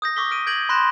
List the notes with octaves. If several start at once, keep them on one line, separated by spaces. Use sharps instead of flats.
D#6 G6 A#6
C#6 D6 E6 B6 G7
F6 D7 D#7
G6 G#6 A#6 D7 F#7
B5 C6 F#6 A#6 D7 E7